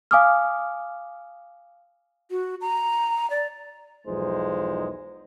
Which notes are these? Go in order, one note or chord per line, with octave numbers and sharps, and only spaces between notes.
F5 G#5 D6 D#6 F6
F#4
A#5
D5
B1 E2 F3 G#3 D#4 C5